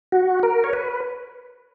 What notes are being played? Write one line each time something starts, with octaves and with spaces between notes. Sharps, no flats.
F#4
A#4
C#5
B4